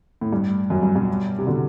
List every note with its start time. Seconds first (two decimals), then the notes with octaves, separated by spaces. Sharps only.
0.21 A2
0.33 G2
0.70 F#2
0.83 G2
0.96 G2 B2
1.38 C3
1.47 B2 D3